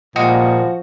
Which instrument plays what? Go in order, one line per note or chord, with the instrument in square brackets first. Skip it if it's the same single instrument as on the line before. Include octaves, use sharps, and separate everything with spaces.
[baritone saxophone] A#2 [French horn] F3 [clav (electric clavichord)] G3 G#3 D#5 [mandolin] F#4